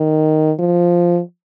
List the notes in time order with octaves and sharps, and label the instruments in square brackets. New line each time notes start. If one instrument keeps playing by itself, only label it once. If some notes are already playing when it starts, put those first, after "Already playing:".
Already playing: [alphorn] D#3
F3